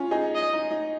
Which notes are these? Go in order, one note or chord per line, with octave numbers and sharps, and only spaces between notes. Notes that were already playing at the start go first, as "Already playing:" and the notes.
Already playing: C#4 F4
D#4 G#4
D#5
D#4
D#4